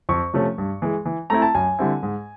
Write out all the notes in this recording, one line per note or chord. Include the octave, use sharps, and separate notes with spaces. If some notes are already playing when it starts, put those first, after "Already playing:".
F2 C#6
C3 F3 A3 C#4
G2
E3 G#3
E3
A3 C4 E4 A#5
A5
F#2 G#5
D3 G3 C4 E4
G#2